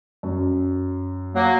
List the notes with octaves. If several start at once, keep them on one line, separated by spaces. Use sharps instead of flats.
F#2
F#3 A#3